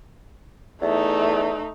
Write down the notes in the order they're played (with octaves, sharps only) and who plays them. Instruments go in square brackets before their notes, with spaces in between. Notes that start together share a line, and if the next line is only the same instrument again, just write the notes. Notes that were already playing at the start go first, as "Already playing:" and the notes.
[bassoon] E2 [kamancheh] A3 D#4